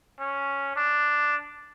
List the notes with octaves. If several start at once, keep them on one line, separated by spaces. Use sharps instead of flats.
C#4
D4